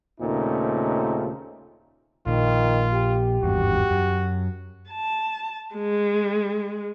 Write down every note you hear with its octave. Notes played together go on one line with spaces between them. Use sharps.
D#2 A#2 C#3 A3 C4 D#4
A#1 A#2 D#3 F4
G4
G#1 E2 G2 F#4
F#2
A5
G#3